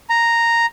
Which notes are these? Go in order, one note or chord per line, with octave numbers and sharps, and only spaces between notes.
A#5